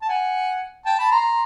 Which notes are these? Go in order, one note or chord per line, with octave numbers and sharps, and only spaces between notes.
A5
F#5 G#5
G5 A5
A5 B5
A#5 C6